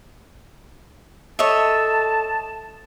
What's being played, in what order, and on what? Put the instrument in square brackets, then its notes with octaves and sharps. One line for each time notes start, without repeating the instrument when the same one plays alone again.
[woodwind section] A4 A5 [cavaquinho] C#5 D#5 E5